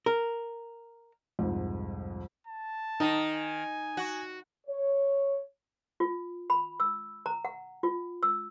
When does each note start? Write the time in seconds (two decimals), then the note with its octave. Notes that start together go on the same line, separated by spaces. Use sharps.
0.06 A#4
1.39 C2 F2 G#2
2.47 A5
3.00 D#3 D#4
3.33 G#5
3.97 F#4
4.67 C#5
6.00 F4
6.50 B5
6.80 E6
7.26 A#5
7.45 F#5
7.83 F4
8.23 E6